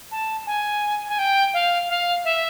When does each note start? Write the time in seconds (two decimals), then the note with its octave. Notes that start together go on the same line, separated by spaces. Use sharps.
0.11 A5
0.46 G#5
1.08 G#5
1.19 G5
1.53 F5
1.89 F5
2.24 E5